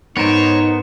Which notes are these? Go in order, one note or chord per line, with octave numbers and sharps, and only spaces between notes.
G#2 B3 D#4 A#4 C5 C#5